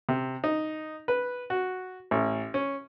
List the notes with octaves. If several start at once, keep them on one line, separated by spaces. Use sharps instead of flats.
C3
D#4
B4
F#4
A1
C#4